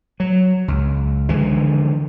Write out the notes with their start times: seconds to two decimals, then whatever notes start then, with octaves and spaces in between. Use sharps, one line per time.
0.20 F#3
0.68 C#2
1.29 D3 E3 F3 G#3